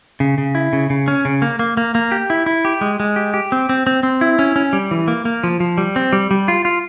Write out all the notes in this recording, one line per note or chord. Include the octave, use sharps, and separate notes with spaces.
C#3
C#3
E4
C#3
C#3
C#4
C#3
A#3
A#3
A#3
A#3
G4
E4
E4
G4
G#3
G#3
G4
G4
C4
C4
C4
C4
E4
C#4
C#4
G3
E3
A#3
A#3
F3
F3
G3
C4
G3
G3
F4
F4